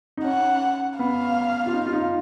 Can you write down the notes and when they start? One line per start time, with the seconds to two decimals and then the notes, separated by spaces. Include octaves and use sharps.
0.17 D#4
0.24 C#4 F#5
0.99 B3 F5
1.66 F4
1.74 D#4
1.86 F4
1.93 D#4